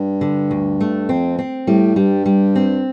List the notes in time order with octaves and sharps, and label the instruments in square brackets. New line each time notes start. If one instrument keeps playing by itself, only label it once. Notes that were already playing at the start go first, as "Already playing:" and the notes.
Already playing: [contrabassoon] G2
[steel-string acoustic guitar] D3
D2
A3
[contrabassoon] F2 [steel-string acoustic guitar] C4
[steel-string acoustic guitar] C4
[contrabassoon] A2 [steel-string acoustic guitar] G3
[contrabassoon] G2 [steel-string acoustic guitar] G3
[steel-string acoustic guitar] G3
C4